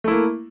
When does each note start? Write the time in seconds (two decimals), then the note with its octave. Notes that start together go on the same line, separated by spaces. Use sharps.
0.04 A3
0.08 E4
0.11 A#3